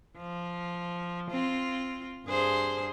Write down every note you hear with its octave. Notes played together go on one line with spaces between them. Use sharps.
F3
C4 F4
G2 G#4 C5